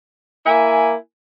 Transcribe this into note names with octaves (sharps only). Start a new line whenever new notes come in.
A#3 E4 G#5